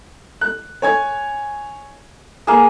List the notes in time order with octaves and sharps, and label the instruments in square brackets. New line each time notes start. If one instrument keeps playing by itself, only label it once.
[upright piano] F#6
C#5 G#5 G#6
[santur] A#3 G#4 [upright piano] D#6